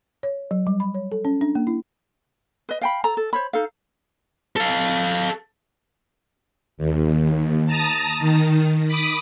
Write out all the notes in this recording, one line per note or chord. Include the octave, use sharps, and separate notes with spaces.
C#5
F#3
G3
B5
C#5
A4
C#4
D4
A#3
E4
B4 D#5
F5 G5 B5
A4 A#5
A4
C5 C#5 B5
D#4 A4 F5
A4 F5
D#2
A5 A#5 D#6
D#3
B5 D6 D#6